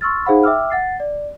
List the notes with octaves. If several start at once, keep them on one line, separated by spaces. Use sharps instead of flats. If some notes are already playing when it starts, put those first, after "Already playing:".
C6 C#6 E6 F6 A6
D#4 G#4 C5 F5 F#5 B5
E5 G5 D6 E6 F6
F#5 A6 C7
D5